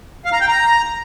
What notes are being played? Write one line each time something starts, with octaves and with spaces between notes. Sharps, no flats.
F5
A#5
G5
A#5